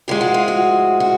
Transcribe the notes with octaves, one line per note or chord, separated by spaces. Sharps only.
A2 F3 G#3 G4
F#4
F4
F#4
F#4